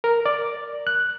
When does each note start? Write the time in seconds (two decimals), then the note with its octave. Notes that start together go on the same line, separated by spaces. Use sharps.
0.04 A#4
0.26 D5
0.87 F#6